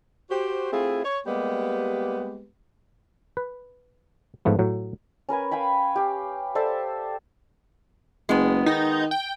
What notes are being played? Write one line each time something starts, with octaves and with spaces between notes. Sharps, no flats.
F#4 G4 C5
A3 C4 E4 F4 G#4
C#5
G3 G#3 A#3 B3 G4 B4
B4
G#2 F3 A3 B3
A2 F#3
C#4 A#4 B4 G#5
F5 G5 G#5 B5
G4 F5
A4 C5 D5 E5
F#1 G#3 B3
D#3 D#4
G5